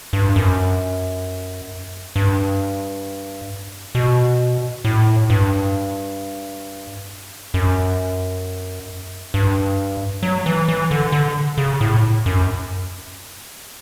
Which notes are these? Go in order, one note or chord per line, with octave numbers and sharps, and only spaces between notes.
G2
F#2
G2
B2
A2
G2
F#2
G2
F#3
E3
E3
D3
D3
C#3
A2
F#2